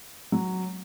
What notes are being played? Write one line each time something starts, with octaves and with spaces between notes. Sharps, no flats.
F#3